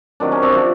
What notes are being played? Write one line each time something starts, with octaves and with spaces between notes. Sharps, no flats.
C3 D#3 F#3 D4
C#4
C4 D4
C3 F3